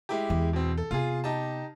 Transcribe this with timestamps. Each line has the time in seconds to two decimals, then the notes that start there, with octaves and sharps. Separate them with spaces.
0.09 G#3 E4 G4
0.30 E2
0.53 B2 C4
0.77 A4
0.91 C3 B3 F4 G#4
1.24 D#4 G4 A5